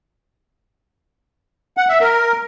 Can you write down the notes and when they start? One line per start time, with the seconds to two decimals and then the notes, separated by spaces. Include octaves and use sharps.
1.77 F#5
1.89 E5
2.01 A#4